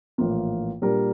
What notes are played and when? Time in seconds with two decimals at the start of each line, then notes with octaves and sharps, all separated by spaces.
0.18 A#1 A2 E3 A#3 F4
0.82 A#2 G3 D4 G4 A#4